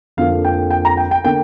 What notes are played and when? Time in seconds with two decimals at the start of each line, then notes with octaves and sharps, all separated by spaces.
0.17 F2 D3 F3 A#3 F5
0.45 G5
0.71 G5
0.85 A#5
0.97 G5
1.11 G5
1.24 D3 A#3 G5